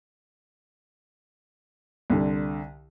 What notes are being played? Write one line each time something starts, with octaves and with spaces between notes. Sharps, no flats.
C2 D3